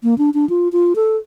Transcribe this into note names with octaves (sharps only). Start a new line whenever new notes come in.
A#3
D4
D4
F4
F4
A4